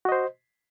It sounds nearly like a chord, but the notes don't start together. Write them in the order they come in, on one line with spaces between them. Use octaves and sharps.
F#4 D#5 C5